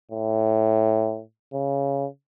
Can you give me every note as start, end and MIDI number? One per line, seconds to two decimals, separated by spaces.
0.11 1.21 45
1.53 2.06 49